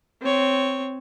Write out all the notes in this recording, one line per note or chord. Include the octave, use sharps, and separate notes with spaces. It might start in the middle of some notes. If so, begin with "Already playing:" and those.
C4 C#5